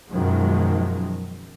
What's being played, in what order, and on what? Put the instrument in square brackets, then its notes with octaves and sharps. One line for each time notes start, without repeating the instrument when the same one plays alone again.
[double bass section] F#2 B2 D#3 F3 F#3 G#3